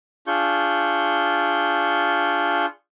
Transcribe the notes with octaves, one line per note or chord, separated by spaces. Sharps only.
D4 F4 G#4 C#6 G6